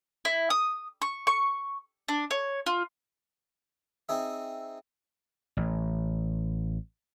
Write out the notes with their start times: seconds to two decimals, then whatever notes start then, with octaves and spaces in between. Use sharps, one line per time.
0.25 E4
0.50 D#6
1.02 C#6
1.27 C#6
2.08 D4
2.31 C#5
2.66 F4
4.09 C4 D#4 G#4 E5
5.57 A1